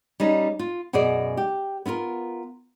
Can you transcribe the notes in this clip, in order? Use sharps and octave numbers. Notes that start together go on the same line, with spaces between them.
G3 C#4 D#4
F4
F#2 B2 F#4 G#4 D5
G4
B3 E4 F4 A#4